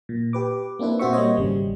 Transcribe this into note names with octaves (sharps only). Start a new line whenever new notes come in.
A#2
G4 B4 D6
A#3 C4 D4 E4 B4
A#2 C4 F#4 C5 E5 C#6
G3 A#3 C5 C#5 D#5
G#1 C#3 G3